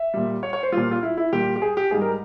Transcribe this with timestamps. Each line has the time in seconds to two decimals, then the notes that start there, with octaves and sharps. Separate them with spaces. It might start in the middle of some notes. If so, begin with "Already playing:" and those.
Already playing: E5
0.14 A#2 G3
0.43 C#5
0.53 C#5
0.63 C5
0.72 A#2 G3 F4
0.91 F4
1.03 E4
1.17 E4
1.32 A#2 G3 G4
1.56 G4
1.62 G#4
1.77 G4
1.91 G#2 G3 G#4
2.01 A#4